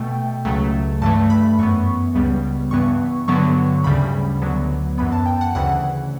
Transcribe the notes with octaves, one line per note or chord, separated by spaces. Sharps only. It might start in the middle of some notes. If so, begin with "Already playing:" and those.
Already playing: B2 A3 G5
C#2 C#3 F#3 A3
G2 E3 A3 A5
B5
F#2 E3 B3 C#6
C#2 C#3 G3 B3
G2 E3 B3 C#6
G2 D3 F#3 B3 C#6
D2 C#3 G3 B5
D2 D3 F#3 B3
F#2 E3 B3 B5
A5
G5
F#5
D2 C#3 E3 F#5